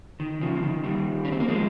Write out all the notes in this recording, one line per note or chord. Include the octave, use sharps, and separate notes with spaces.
D#3
C#3 F3
C#3
D#3
D#3 G3
C#4
C4
A#3
F3 G#3